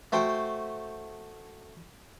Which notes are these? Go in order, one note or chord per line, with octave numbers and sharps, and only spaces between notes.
A3 F#4 C5 G5